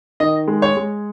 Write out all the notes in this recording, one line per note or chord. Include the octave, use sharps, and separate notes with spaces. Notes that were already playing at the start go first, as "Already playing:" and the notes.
D#3 D#5
G#3
C#5
G#3